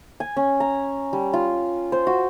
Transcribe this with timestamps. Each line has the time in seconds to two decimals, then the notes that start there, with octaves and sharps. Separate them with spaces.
0.20 G#5
0.37 C#4
0.60 A#5
1.13 G3
1.33 F4
1.92 C5
2.07 F#4